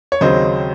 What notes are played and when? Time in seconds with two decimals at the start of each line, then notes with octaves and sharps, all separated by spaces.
0.12 C#5
0.21 D#2 C#3 F#3 C4 C5 D#5